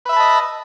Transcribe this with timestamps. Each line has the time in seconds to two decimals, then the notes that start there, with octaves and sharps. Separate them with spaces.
0.06 B4
0.09 E5
0.13 B5
0.16 A5
0.20 D#5